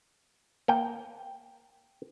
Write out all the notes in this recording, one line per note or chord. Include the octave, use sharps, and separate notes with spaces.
A#3 G5